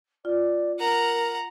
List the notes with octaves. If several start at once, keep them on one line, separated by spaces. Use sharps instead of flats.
F4 D5
A#4 F#5 A#5